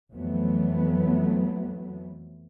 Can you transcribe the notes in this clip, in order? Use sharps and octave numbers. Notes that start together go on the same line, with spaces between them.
F2 E3 F#3 A3 B3